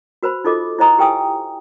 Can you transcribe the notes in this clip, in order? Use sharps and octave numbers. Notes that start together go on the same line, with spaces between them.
F#4 B4 C5 B5
D#4 F4 A4 D#5 D6
E4 C5 D#5 A#5 D#6
G4 B4 G5 G#5 D#6